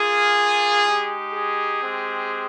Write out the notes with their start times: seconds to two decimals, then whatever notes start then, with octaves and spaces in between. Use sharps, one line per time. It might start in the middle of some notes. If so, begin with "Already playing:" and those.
Already playing: A#3 F4 G#4
0.84 G#3 D#4 G4
1.32 G#4
1.81 G#3 C4 G4